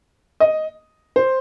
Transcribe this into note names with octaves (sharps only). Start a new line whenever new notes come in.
D#5
C5